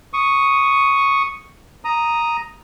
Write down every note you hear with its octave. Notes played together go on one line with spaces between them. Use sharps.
C#6 D#6
A#5 D#6